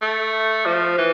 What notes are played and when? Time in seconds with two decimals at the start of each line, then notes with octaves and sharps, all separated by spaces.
0.02 A3
0.66 F3
0.98 E3